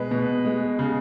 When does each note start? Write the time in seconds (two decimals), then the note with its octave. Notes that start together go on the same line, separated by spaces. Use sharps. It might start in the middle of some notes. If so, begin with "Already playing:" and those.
Already playing: B2 G#3 B4
0.11 B2
0.45 G#3
0.79 C#3